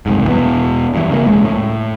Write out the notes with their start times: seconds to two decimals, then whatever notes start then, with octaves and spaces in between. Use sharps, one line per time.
0.06 F#1 C2 G#2
0.27 E1 E3 B3
0.94 G2 E3
1.10 C#3 A#3
1.26 E1 C#2 G#3
1.44 A2